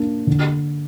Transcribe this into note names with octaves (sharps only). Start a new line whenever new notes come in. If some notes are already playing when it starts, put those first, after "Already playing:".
Already playing: A#3 D4
D3